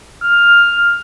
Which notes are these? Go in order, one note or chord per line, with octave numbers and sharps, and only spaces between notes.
F6